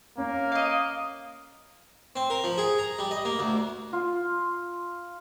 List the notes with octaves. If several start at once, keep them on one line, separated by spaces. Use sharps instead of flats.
A#3 C#4
D#5 F5
C4
A#4
F3
G#4
A#5
G3
D#5
A#3
D2
F4